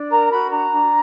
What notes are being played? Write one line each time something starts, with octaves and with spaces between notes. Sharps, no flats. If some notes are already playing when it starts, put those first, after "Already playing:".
Already playing: D4
A#4 A#5
F#4 B5
D4 A#5
D4